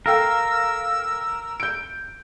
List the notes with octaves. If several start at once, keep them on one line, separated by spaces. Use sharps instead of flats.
A4 A#4 F5 G5 E6
G6 D7